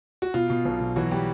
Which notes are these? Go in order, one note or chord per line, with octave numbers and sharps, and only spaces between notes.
F#4
B2 F4
B2
B1
B2
E3 F#3 F#4
G3 G4